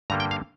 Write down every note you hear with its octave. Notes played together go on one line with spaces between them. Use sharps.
G2 D3 G3 A#3 A#5
G5
F5